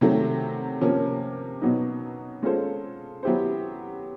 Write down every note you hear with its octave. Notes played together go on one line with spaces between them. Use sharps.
C3 D#3 F#3 A3
C3 F3 A#3 C#4
B2 F#3 B3 D#4
G#3 C#4 F4 A4 C5
F#3 B3 E4 G4 C5